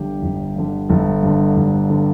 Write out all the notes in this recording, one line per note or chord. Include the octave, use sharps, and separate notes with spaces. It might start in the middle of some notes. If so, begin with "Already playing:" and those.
Already playing: G1 G2 D3 G4
G1
G2 D3
G1 A4
G2 D3
G1
D3